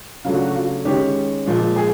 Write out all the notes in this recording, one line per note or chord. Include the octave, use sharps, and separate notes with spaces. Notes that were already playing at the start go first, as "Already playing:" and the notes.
C#3 F#3 A3 D4 F4
F#4
F#4
F4
D#3 G#3 C#4 G4
A#2 F3 G#3
G#4